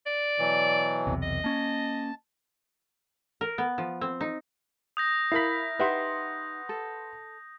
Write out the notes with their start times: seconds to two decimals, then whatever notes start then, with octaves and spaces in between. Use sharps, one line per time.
0.06 D5
0.39 B2 E3 F#3
1.07 B1 E2 C3
1.22 D#5
1.44 A#3 C#4 A5
3.41 A#4
3.58 B3
3.78 F3
4.01 C4
4.21 D#4
4.97 D#6 G6 A#6
5.32 E4 A#4 F5 B5 B6
5.79 D#4 G4 B4 E5 F#5 C6
6.69 A4